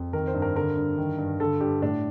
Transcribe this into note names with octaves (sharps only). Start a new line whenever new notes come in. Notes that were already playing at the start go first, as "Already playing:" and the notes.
Already playing: F2
D#3 A#4
C5
G2
A#4
D3 A#4
G2
D#3
G2
D3 A4
G2 G4
A2 D4